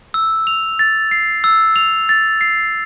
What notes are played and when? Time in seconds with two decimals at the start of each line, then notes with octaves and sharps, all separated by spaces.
0.14 E6
0.47 F7
0.79 A6
1.11 C7
1.44 E6
1.76 F7
2.09 A6
2.41 C7